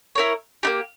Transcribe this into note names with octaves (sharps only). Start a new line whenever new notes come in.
E4 A#4 C#5
A#3 D#4 G4